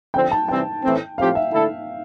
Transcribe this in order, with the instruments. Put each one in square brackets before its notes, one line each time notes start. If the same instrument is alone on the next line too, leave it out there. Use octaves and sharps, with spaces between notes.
[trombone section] D3 F3 C4 [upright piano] G5
[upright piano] A5
[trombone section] C3 E3 G3 C4 [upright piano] G5
[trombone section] A2 E3 A3 C4
[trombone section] A2 F3 C4 G4 [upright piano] F5
[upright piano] E5
[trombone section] D3 A3 E4 A4